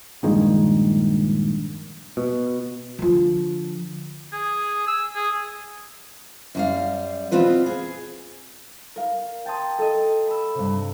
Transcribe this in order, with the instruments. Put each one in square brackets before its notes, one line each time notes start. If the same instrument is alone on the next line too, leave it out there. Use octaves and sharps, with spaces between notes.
[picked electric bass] A#1 G2 D#3 G#3
B2
[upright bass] D3 F3
[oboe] G#4
E6
G#4
[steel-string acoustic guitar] F#2 G3 F5
B2 B3 C4 F4 B4
G#4
[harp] A#4 F5
G5 A5 A#5 C6 D#6 G#6
A4 D#5
B5 E6
G2 C3